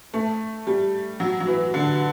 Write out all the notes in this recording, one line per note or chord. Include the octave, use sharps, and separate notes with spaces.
A3
G3
F#3
F#3
E3
D3